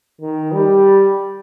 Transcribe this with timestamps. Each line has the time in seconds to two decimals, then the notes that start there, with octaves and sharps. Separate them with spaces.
0.21 D#3
0.52 G3